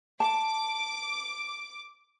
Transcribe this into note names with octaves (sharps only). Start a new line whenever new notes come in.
A5 D6